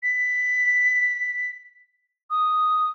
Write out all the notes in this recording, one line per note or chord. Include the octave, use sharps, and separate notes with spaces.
B6
D#6